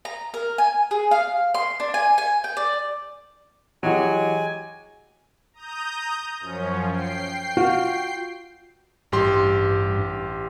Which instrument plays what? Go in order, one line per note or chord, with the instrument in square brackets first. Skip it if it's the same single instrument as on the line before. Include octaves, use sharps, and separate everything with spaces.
[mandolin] A#5
A#4
G#5
G#4
F5
C6
D4
G#5
G#5
G5
D5
[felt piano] E3 [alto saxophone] F#3 [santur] G#3 G4 [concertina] G#5
[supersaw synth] A#5 D#6 G6
F#2 F3 C#4
G5 C7
[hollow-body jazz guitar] F4 F#4
[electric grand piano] A1 G4 C6 [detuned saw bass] G2